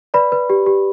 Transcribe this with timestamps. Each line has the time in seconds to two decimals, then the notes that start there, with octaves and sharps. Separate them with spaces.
0.14 B4 D5 B5
0.32 B4
0.50 G4
0.66 G4